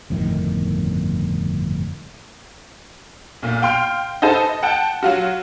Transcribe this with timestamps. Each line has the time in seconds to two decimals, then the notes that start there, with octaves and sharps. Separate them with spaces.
0.10 G1 F2 A2 D#3
3.42 B1 A#2
3.62 F5 G5 C6 F6
4.22 D#4 G#4 A4 B4 C5 A5
4.49 D#5
4.63 F#5 G5 A5
5.03 F#3 F4 F#4